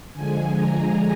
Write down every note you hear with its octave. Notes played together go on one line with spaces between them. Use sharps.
D3 F3 G#3 G#5
A#5